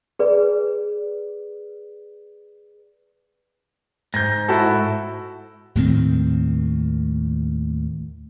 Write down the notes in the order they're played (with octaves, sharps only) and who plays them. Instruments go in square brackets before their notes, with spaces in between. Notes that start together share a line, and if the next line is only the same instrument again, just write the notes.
[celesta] G#4 B4 D5
[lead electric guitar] G#2 [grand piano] G6 A#6
[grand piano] E4 F#4 A4
[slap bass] D#2 A2 D#3 C4